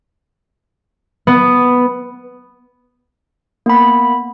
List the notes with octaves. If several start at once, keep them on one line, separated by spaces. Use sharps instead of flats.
B3
A#3 B3 B5